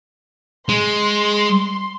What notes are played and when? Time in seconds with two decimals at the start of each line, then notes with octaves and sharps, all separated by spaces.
0.69 G#3 C6